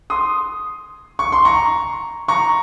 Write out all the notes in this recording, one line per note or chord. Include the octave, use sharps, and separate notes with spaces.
C6 D#6
C#6
C6
A#5 C#6
A#5 C#6